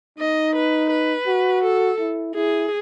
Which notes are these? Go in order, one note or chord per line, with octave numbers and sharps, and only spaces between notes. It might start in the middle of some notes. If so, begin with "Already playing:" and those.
D#4 D#5
B4
B4
F#4
A4
E4
E4 G#4